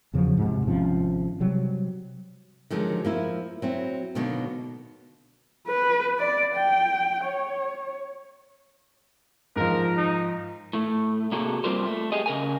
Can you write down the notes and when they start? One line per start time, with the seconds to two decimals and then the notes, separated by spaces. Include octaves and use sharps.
0.13 E2 C#3 F3 F#3
0.38 G#2 C3
0.66 G#1 C3 F3 C#4
1.40 C3 F#3 G3
2.70 D3 D#3 F3 F#3 G#3
3.05 F3 A#3 E4
3.62 F#3 C4 E4
4.15 B2 D3 D#3 F#3 A#3 B3
5.68 B4
6.19 D5
6.56 G5
7.24 C#5
9.56 G#2 F3 A#4
9.97 D#4
10.73 A2 A3
11.32 C3 A#3 F#4 G#4 A4
11.64 G3 A#3 C4 F4 A#4 C5
11.86 A3
12.12 G4 G#4 D#5
12.26 C#3 A#4 G#5